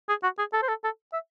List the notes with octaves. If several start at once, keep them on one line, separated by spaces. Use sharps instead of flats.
G#4
F#4
G#4
A4
C5
A4
A4
E5